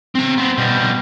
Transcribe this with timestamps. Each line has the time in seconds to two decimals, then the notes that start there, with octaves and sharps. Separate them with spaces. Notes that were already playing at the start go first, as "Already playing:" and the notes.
0.15 C4 A#5
0.38 B3 C4
0.58 B2 G3